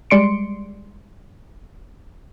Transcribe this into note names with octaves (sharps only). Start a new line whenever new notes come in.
G3 G#3 D5 C6 C#7 D7